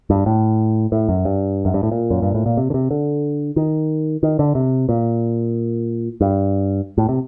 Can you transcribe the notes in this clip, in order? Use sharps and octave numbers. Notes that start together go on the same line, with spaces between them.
G2
A2
A2
F#2
G2
F#2
G2
A2
A#2
F#2
G2
A2
A#2
C3
D3
C3
D3
D#3
D#3
D3
C3
A#2
G2
A2
C3